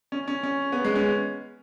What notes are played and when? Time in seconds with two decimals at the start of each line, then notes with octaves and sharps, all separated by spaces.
0.12 C#4
0.28 C#4
0.43 C#4
0.72 B3
0.84 G#3
0.95 C#4